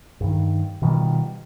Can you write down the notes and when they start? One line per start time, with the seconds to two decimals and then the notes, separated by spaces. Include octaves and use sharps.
0.21 G2 D#3
0.82 B2 D#3 F3 G3